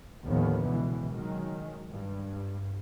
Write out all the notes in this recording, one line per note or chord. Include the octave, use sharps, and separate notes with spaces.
D#2 A2 D3 D#3 F3 B3
C#2 B2 E3
D#3 F#3 G#3
G2